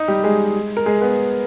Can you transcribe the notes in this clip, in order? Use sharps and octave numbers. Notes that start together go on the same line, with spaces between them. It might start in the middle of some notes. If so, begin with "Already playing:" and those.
Already playing: D#4
G3 G4
G#3 G#4
A#4
G#3 G#4
B3 B4